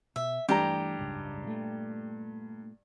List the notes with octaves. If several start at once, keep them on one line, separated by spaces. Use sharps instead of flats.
B2 E5
G2 E3 A3 G4 A#5
F#1 C#2 G#2
A#2 A3